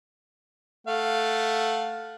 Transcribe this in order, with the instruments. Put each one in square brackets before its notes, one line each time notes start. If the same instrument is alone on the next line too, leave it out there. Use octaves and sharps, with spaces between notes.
[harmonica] A3 F5 F#5